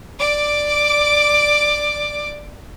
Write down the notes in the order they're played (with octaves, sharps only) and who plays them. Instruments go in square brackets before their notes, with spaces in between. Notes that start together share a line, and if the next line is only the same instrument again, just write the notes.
[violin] D5 D6